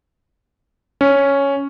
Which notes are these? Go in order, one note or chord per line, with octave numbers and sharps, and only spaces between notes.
C#4